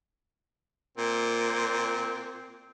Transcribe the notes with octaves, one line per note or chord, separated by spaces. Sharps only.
A#2 C4